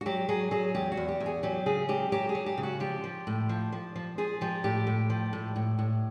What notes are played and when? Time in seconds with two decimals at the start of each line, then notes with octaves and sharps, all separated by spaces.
0.01 F#4
0.06 F#3 G4
0.28 F#3 G#4
0.51 F#3 G#4
0.75 E2 G4
0.92 F#4
0.97 E2
1.08 G4
1.20 E2
1.26 G#4
1.43 F#3 G4
1.66 C#3 G#4
1.89 F#3 G4
2.12 F#3 G4
2.29 G#4
2.35 F#3
2.46 G4
2.57 C#3
2.63 F#4
2.80 F3 G4
3.04 F3
3.27 A2
3.49 F3
3.72 F3
3.95 F3
4.18 F3 G#4
4.41 F3 G4
4.64 A2 G4
4.87 A2
5.10 F3
5.33 A2
5.56 A2
5.79 A2